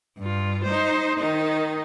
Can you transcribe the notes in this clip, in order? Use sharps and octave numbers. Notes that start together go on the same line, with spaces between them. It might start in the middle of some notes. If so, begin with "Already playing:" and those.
G2 F4
D#4 C5
D#3 D#4